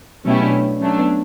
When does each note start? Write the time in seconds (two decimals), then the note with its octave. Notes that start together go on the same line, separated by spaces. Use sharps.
0.25 B2 F#3 A3 C#4 E4 G4
0.43 D4
0.80 F#3 A3 C#4 D4
0.98 B3